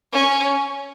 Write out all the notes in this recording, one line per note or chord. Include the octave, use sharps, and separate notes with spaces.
C#4